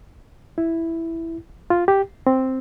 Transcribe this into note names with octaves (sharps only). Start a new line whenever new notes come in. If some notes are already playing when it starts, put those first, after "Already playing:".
E4
F4
G4
C4